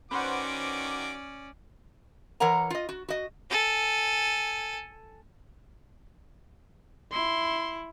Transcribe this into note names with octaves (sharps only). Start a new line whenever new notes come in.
D#3 C#4 F#4 B4 C5 D5 F#5 D6
E3 A#4 C#5 F#5 A#5
F4 D#5
F#4
F#4 D#5
A4 G#5
E4 C6